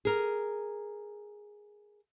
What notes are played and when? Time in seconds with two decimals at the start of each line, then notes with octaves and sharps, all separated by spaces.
0.05 G#4 A#4